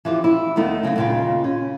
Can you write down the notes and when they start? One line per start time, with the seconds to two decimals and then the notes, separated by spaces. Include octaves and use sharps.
0.05 E3 F3 G4
0.24 E4
0.56 D#2 D#3 A3 B3 D#4
0.83 C#3 F#3 A3 C4
0.96 D#2 A#2 C#3 F4 G5
1.44 C#4